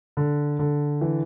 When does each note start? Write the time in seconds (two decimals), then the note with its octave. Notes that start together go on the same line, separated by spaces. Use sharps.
0.17 D3
0.59 D3
1.01 E3